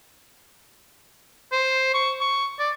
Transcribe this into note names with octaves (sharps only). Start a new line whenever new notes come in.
C5
C#6
C#6
D5